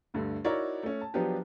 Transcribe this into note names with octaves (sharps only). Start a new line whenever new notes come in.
D2 G2 D3 A3
D#4 E4 F#4 A#4 C#5 D5
A3 C#4
A5
F3 F#3 B3 D4 G4 B4